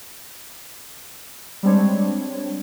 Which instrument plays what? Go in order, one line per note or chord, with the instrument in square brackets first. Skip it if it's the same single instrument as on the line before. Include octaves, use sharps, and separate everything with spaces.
[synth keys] G3 G#3 C4 D4 C#5